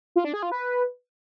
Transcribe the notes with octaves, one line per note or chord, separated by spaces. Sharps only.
F4
D4
G#4
F4
B4